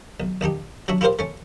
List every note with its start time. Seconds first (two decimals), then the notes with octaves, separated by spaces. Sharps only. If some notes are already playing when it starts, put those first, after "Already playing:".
0.20 B1
0.41 A#1 D4 D#4 G4
0.88 F#3 D4 F#4 E5
1.01 E4 F4 G4 A#4 C5 F5
1.19 A3 C#4